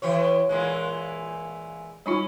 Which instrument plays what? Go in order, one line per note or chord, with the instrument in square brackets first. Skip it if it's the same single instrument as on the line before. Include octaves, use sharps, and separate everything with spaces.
[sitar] E3 G4 C#5
A#2 E3 G#3
[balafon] G3 D#4 F4 [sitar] C#4